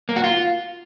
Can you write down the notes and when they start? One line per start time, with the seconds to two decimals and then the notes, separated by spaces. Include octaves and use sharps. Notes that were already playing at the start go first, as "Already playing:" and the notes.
0.09 A#3
0.16 F#4
0.24 F4